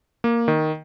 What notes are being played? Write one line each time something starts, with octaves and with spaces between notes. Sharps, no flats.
A#3
D#3